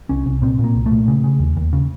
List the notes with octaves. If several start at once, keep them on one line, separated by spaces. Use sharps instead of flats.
C2 C#4
C2
A#2 C4
A#2
A#3
C2
A3
A#2
C#3
C#3
D#2
D#2
C#3